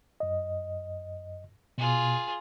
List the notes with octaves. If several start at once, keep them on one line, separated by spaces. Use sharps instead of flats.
F#2 D#5
B2 F4 G#4